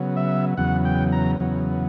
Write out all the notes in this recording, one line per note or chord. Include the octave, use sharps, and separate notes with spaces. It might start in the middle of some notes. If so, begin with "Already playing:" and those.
Already playing: C#3 F#3 B3
E5
E2 C#3 F#3 B3 F#5
G5
A#5
E2 C#3 F#3 B3